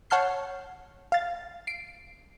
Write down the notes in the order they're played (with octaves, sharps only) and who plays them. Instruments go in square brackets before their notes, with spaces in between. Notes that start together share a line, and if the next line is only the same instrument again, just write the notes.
[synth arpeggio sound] C#5 F#5 A5 F6 G6 C7
F5 A6
C7 D7